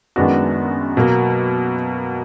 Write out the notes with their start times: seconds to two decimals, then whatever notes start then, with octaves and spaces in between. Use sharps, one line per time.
0.16 F#2 D#3 G#3 B3 D4 F#4
0.97 B2 F#3 A#3